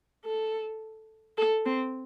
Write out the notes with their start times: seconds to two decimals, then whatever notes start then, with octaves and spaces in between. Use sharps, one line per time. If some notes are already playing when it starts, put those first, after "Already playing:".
0.25 A4
1.38 A4
1.65 C4